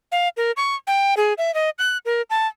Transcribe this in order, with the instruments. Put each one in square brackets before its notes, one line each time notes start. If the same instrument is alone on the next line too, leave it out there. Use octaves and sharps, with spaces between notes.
[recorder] F5
A#4
C#6
G5
G#4
E5
D#5
F#6
A#4
A5